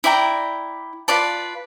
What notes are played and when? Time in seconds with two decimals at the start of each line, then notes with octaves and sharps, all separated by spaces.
0.04 E4 D5 G5 A#5
1.08 F4 B4 D5 A5